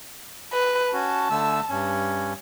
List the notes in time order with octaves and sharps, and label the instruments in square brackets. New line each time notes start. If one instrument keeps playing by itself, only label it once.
[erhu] B4
[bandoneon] C#4 F#4 [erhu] A5
[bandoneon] D3 A3 E6
G2 C#4